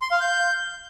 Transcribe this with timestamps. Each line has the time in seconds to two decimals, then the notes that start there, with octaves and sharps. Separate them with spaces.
0.02 C6
0.11 F5
0.21 G6